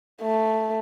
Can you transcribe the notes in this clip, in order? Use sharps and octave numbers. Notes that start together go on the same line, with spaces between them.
A3